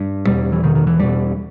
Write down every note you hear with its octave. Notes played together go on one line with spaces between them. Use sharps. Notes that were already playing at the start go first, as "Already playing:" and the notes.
Already playing: G2
E2 B2 G3
E3
E2 B2 D#3
D#3
E3
E2 B2 G3